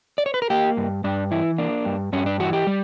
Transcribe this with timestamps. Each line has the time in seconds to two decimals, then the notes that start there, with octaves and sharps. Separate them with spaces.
0.18 D5
0.26 C#5
0.34 B4
0.42 A#4
0.50 A#3 G4
0.77 G2
1.04 G2 D4
1.31 E3 E4
1.58 A#3 D4
1.85 G2
2.13 G2 C#4
2.26 D4
2.40 E3 F#4
2.53 G4
2.67 G3